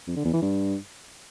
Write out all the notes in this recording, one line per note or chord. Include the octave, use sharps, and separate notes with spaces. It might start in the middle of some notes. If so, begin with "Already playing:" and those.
F2
D3
E2
E3
G2